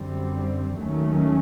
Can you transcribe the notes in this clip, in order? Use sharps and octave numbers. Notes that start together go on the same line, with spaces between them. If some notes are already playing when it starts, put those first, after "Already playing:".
Already playing: F#2 D3 G3 C4
D#2 D#3 F#3 A3 C#4